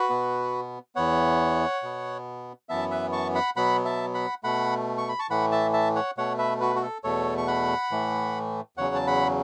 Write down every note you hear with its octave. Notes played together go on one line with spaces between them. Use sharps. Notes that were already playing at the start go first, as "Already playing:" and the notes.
Already playing: F#4 B4
B2 B3
E2 E3 B3 C#5 F#5
B2 B3
F#2 E3 B3 E5 A5
B4 E5
A5 C#6
F#5 B5
B2 F#3 B3 F#5 B5
E5 A5
F#5 B5
B2 A3 F#5 B5
C#6
B5
A5 C#6
A2 E3 A3 F#5 B5
E5 A5
E5 A5
C#5 F#5
B2 A3 C#5 F#5
B4 E5
F#4 B4
F#4
A4
E2 B2 A3 A4 C#5
C#6
F#5 B5
A2 E3 A3
E2 C#3 F#3 C#5 F#5
A5
F#5 B5